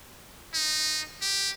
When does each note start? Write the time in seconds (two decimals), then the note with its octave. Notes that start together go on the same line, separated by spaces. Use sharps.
0.54 D#4
1.22 G4